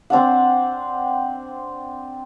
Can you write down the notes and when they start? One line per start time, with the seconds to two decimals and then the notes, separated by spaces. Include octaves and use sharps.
0.10 C4 D4 F#5